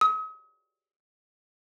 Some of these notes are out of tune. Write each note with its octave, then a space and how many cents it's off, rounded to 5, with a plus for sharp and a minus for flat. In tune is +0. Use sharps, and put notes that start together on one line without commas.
D#6 +45